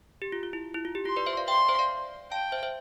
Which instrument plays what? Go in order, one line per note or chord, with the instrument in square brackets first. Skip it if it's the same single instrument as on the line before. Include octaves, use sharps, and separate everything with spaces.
[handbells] G4
F4
F4
E4
E4
F4
G4
[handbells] F4 [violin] C6
[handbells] B4 D5
C5 E5
D5 F5
[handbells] E5 G5 [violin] C6
[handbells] C5 E5
D5 F5
[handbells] F5 A5 [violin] G5
[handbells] C5 E5
C5 E5